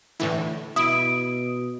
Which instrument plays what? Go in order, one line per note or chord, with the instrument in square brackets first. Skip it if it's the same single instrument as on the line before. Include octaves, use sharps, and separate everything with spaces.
[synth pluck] A2 D3 E3
[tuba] B2 [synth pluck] E4 [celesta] D#6 D7